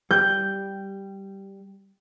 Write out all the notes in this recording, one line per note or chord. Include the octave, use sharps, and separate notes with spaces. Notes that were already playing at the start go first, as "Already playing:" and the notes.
G3 G6